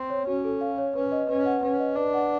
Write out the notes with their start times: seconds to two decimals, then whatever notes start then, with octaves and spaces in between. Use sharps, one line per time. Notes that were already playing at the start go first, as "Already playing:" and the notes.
Already playing: C4
0.10 C#5
0.27 C#4 F#4
0.44 A4
0.61 F5
0.78 C#5
0.95 C#4 B4
1.12 D#5
1.29 C#4 B4
1.46 F#5
1.63 C#4 B4
1.80 D#5
1.96 D4 B4
2.14 F#5